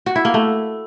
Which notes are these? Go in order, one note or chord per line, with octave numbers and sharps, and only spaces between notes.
F#4
E4
A#3
A3